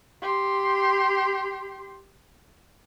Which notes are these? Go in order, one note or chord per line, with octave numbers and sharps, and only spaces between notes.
G4 C6